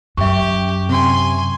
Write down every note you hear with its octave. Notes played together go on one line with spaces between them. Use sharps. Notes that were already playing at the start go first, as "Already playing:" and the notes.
F#2 G4 E5 C#6
C3 G#5 C6